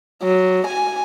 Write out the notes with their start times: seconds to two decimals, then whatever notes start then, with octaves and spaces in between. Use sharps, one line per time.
0.23 F#3
0.67 G#5